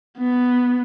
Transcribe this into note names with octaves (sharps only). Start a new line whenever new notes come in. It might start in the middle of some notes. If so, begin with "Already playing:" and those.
B3